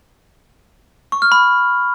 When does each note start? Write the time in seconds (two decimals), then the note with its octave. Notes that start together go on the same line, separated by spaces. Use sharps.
1.12 C#6
1.22 F6
1.32 B5